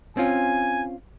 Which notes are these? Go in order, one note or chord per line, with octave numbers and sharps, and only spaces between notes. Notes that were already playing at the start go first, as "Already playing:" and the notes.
C4 C#4 F4 G#5